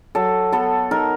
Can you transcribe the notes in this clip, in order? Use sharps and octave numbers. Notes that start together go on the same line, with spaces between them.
F#3 A4
B3 A4
D#4 A#4